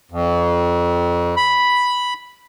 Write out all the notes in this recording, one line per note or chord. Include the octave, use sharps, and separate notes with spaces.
F2
B5